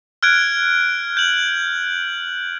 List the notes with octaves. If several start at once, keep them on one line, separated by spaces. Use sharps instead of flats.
F6 F#6 G#6 D7
G6 F#7